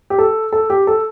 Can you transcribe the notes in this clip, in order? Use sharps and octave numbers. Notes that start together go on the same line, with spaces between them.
G4
A4
A4
G4
A4